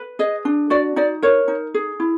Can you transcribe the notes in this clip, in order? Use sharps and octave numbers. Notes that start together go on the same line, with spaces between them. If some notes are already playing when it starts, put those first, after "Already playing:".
Already playing: B4
G#4 D#5
D4
F#4 D5
D#4 D5
A#4 C#5
D#4
G#4
E4